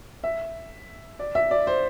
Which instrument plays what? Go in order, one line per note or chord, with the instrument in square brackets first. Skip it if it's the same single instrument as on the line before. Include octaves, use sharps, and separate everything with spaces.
[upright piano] E5
D5
E5
D5
C5